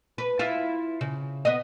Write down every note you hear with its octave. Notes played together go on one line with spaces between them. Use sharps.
B4
E4 F4
C#3
B3 D#5